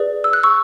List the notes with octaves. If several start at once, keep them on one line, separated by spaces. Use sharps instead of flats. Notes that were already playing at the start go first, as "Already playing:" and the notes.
Already playing: G#4 B4 D5
E6
F#6
C#6 E6